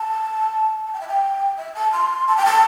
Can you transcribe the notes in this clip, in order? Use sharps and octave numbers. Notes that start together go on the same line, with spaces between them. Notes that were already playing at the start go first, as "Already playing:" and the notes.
Already playing: A5
A5
G5
E5
G5
E5
A5
C6
A5
G5
A5